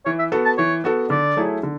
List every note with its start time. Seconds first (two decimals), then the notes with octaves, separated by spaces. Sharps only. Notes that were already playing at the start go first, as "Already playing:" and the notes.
0.06 E3 C#5
0.19 E5
0.32 B3 F#4 A4
0.46 A5
0.58 E3 C#5
0.84 B3 F#4 A4
1.10 D3 D5
1.36 F#3 A3 E4 G#4
1.63 D3